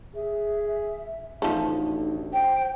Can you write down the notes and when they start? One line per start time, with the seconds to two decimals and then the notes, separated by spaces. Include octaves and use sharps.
0.15 G#4 E5
1.42 A1 D2 F3 A3 D#4
2.33 C5 G5